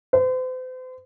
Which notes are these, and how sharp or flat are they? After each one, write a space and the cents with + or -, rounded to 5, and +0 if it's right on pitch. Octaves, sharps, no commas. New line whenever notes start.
C5 -40